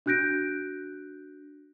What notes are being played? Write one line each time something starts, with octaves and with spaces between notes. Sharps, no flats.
D4 F#4 F#6 G6 A#6 D7